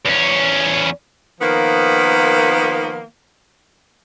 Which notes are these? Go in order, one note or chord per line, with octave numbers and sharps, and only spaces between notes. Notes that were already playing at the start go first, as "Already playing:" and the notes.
E2 C#4
D#3 F3 A#3 B3